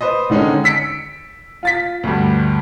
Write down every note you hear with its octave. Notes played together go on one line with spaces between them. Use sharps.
B4 C5 D#5
D3 D#3 G#3 C#4 D#4
E6 B6 C#7 D7
F4 A6 B6
D2 G2